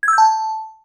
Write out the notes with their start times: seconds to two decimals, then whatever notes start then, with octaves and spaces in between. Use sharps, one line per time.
0.03 G#6
0.08 E6
0.13 G6
0.18 A5